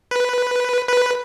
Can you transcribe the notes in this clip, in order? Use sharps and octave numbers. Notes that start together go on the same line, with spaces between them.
B4
B4